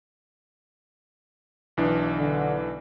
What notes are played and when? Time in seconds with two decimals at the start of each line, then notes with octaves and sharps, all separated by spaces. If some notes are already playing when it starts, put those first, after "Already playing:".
1.77 B1 E3 D4
2.17 D3